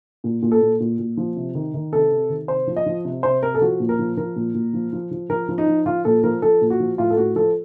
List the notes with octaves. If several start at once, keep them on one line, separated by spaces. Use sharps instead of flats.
A#2
A#2
A4
A#2
A#2
A#2
F3
C3
D#3
D#3
C3 A4
C3
D#3
C3 C5
F3
D#5
F3
C3
C3 C5
C3 A#4
A4
F3 F#4
A#2
A#4
F3
F3 A#4
A#2
A#2
F3
F3
F3
F3 A#4
F3
D#4
F3
F3 F4
A#2 A4
F3 A#4
F3 A4
A#2
F#4
F3
A2 F4
A4
A2 F#4
F3 A4